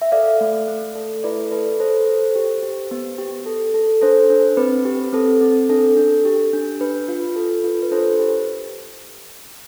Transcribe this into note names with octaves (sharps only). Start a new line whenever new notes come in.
E5
A4 D5 F5
A3
A3
A4
E4 B4 D5
A4 B4
A4 C5
A4
G4
G4
B3
G4
A4
A4
D4 A4 C5
D4
C4 B4
G4
C4 A4
C4
D4 A4
D4
G4
D4
D4 B4
F4
A4
F4
B4
D4 A4 C5
G4